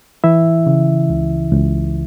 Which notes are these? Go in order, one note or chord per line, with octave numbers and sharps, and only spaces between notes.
E3 E4 E5
C#3
C#2
C#2